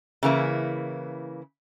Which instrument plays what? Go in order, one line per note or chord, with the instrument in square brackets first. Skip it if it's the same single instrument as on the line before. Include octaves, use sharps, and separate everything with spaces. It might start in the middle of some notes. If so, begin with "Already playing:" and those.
[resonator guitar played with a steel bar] C#3 E3 A#3 E4